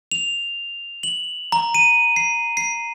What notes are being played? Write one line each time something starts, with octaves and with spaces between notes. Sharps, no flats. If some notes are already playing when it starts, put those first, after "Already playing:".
F7
F#7
A#5
D#7
C7
C7